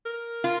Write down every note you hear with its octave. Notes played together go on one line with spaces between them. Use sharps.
A#4
F4